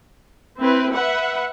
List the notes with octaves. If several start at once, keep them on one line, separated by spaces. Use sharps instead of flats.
C4 E4 B4
B4 E5 F#5